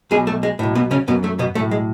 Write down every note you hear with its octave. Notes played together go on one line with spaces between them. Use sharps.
B1 B2 G#3 G#4
A3
G#3
B1 A2
B2 B3
C#3 C#4
F#2 B2 B3
A3
B2 B3
B1 A2 A3
G#3